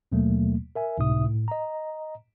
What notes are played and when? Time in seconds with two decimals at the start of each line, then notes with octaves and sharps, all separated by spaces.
0.12 D#2 B2 F#3 A3 A#3
0.75 A#4 E5 G#5
0.98 C#2 A2 C3 D#4 E5 D#6
1.25 A2
1.48 D#5 A#5